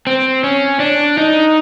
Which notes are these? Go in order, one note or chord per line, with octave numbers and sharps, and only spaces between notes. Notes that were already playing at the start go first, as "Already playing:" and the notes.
C4
C#4
D4
D#4